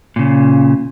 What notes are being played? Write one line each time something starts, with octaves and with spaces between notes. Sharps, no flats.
A#2 C#3